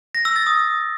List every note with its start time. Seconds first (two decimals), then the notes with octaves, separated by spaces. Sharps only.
0.15 A#6
0.25 E6
0.36 A6
0.47 D#6